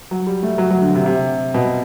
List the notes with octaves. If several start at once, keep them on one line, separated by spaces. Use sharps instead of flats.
F#3
G3
A3
F#3
F#3
D3
C3
C3
B2